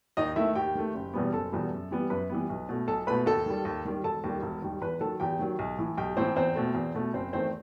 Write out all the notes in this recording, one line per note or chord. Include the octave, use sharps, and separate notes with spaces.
D#2 D#4 D#5
D#3 A3 E4 E5
D#2 G4 G5
D#3 A3
F#1
E2 B2 G3 B3
F#1 A4 A5
E2 B2 G3 B3
F#2
E3 G3 B3
F#2 B4 B5
E3 G3 B3
B1
B2 A3
B1 A4 A5
B2 A3 B4 B5
D#2 A4 A5
D#3 G3
D#2
D#3 G3
E1 A4 A5
D#2 D#3 G3
E1
D#2 D#3 G3
E2 B4 B5
D#3 F#3 A4 A5
E2 G4 G5
D#3 F#3
B1
A2 E3
B1 G4 G5
A2 E3 C4 C5
E2 C4 C5
B2 A3
E2
B2 A3
F#1 C4 C5
E2 D#3 A3 C4 C5